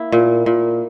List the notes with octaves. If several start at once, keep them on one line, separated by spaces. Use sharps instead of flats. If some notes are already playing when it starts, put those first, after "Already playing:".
Already playing: A#3 E4
A#2
A#2